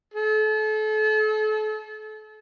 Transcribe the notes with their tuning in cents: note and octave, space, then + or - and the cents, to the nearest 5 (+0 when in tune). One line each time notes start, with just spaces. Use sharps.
A4 -35